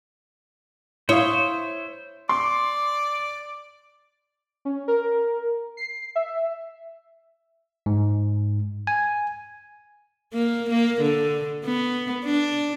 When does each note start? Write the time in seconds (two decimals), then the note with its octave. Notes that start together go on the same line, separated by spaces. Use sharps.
1.09 E4 C5 C#5 F5 D#6 G7
2.29 D5 C6 D6
4.65 C#4
4.88 A#4
5.77 C7
6.15 E5
7.86 G#2
8.87 G#5
10.33 A#3
10.70 A#3
11.02 D3
11.65 B3
12.24 D4